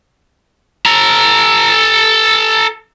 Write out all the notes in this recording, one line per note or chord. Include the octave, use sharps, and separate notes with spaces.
A4 A#5